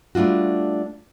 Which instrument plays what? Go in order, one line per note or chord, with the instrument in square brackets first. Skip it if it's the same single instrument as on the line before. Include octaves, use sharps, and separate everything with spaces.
[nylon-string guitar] G3 A3 D4 F4 F#4